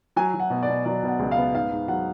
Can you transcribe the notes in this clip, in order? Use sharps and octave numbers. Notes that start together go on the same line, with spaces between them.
F#3 G#5
F#3
F#5
B2
D5
B2
F#3 D5
B2
F#5
C#2
F5
B3
G#2 F5
G#2
F#3 F#5